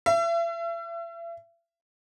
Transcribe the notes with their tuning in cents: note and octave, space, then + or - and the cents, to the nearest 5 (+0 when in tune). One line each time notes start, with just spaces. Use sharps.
E5 +40